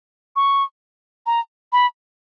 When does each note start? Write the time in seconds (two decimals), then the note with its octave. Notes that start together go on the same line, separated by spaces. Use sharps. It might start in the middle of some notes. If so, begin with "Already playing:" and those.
0.36 C#6
1.26 A#5
1.72 B5